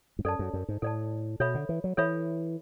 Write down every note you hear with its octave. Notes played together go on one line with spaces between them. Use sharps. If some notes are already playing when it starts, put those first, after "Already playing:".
G#2
F#2 A4 D5 A5
F#2
F#2
G#2
A2 A4 D5 A5
B2 A4 C#5 E5 B5
D3
E3
F#3
E3 A4 C#5 E5 B5